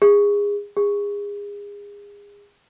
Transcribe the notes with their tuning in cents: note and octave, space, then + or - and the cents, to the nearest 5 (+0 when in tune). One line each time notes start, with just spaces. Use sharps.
G#4 -25
G#4 -30